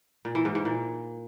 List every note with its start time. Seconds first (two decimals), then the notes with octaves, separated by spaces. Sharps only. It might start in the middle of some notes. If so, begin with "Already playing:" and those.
0.25 A#2
0.35 E3
0.45 G#2
0.55 G#2
0.65 A#2